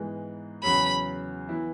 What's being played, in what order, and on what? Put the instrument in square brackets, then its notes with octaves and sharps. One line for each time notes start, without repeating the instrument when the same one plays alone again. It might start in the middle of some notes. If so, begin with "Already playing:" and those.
Already playing: [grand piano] G#2 E3 G#3 B3
[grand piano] E2 C#3 F#3 [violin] B5
[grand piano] E3 B3 E4